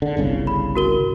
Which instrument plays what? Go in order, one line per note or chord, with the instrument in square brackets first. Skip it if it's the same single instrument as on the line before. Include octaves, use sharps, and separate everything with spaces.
[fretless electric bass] D3
G1 C2 C#3
[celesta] B5
F#4 A#4 G7